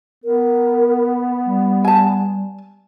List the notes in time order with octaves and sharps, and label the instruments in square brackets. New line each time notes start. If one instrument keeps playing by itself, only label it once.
[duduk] B3 [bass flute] A#4
[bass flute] G3
[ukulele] G#5 A5